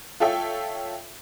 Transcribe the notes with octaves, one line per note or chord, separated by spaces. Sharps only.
F4 A4 C#5 E5 G5